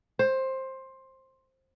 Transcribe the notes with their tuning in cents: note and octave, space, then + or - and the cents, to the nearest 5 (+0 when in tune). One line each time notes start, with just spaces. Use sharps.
C5 +15